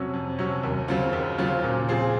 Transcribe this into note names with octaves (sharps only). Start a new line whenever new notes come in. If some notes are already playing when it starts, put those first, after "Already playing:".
Already playing: F2 C3 F#3 C#4
F2
C3 F#3 C#4
D#2
C#3 F#3 C4 F4
D#2
C#3 F#3 C4 F4
A#2
F3 C4 F4 G#4